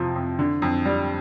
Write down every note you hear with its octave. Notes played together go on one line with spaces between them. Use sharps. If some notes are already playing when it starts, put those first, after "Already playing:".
Already playing: F2 C3 F3
F2
D3
F2
G3